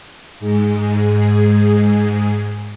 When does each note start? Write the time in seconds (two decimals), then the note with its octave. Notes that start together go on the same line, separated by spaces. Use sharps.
0.40 G#2 G#3